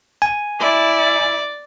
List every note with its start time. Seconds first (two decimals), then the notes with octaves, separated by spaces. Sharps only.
0.22 G#5
0.60 E4 D5